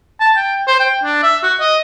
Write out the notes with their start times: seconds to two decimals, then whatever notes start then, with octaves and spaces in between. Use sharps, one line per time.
0.20 A5
0.36 G5
0.67 C5
0.80 G5
1.03 D4
1.23 E5
1.43 F#4
1.60 D#5